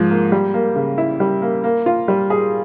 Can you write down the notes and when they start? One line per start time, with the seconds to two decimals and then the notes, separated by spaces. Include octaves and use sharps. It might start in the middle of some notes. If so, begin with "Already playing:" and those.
Already playing: G#2 F3
0.10 A#3
0.32 G3
0.54 A#3
0.76 C#3
0.98 E4
1.20 G3
1.42 A#3
1.64 A#3
1.86 F4
2.08 G3
2.30 G#4